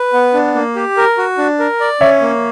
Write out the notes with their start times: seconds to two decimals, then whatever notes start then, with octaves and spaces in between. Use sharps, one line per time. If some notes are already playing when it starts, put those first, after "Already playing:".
Already playing: B4
0.13 B3
0.34 D4
0.55 A#3
0.76 G4
0.97 A#4
1.18 F#4
1.38 D4
1.59 A#4
1.80 D5
2.01 C#4 C#5 E5
2.21 A#3